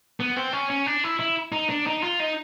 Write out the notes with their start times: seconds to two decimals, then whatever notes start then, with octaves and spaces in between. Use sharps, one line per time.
0.20 B3
0.36 C4
0.53 C#4
0.70 C#4
0.86 D4
1.04 E4
1.19 E4
1.52 D#4
1.69 D4
1.87 D#4
2.03 F4
2.20 D#4